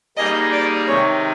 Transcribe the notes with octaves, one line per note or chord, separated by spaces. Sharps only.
G3 A#3 D#4 G#4 D#5
D5
C3 D#3 G#3 C#5